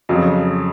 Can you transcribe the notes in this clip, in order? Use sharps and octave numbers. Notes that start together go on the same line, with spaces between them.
F2 C#3 F#3